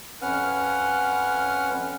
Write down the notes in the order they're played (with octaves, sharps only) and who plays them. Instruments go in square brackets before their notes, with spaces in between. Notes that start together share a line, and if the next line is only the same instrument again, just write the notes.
[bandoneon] F2 C#4 B4 F#5 F6